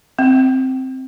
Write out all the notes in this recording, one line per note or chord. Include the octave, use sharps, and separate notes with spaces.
C4